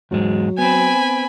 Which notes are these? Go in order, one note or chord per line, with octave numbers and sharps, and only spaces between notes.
E2 G#2 F#3 G#3
B3 C4 G#5 B5